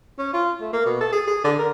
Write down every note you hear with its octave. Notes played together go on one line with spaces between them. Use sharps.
C#4
F4
A3
A#3
B2
A4
G#4
G#4
D3
A#4